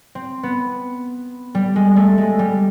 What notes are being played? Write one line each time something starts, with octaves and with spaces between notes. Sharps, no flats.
C4
B3
G3
G#3
A3
G#3
G3